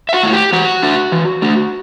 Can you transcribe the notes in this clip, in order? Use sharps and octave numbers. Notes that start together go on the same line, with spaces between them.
E5
F#4 F#5
A3 E4
G4 G5
E3 F#4 F#5
A3 D4
E3
A3 D4